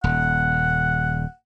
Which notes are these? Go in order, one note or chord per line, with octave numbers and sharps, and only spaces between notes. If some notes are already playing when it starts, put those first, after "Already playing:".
D#1 F#5